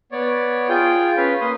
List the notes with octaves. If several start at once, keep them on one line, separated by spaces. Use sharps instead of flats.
B3 C#5 D5
F4 G#4 G5
C#4 B4 F5
A#3 B4 C6 D#6